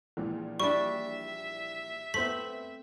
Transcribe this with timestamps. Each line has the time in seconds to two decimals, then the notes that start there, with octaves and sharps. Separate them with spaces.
0.17 A#1 A#2 E3
0.60 G3 D4 E5 C#6
2.14 A3 B3 C4 B6 F#7